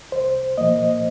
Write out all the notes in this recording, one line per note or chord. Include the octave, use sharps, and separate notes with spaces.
C2 C5
A#2 F3 A#3 D#5